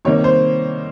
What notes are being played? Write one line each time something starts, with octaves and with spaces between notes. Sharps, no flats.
C3 D#3 G3 A#3 C#5
C5